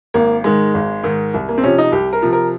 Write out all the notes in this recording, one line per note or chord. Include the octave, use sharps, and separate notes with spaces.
G#1 A#3
G#2 D#3 G#3
G#1
G#2 D#3
C2
A#3
C4
C3 F3 C#4
D#4
C2 G4
A#4
C3 F3
A#4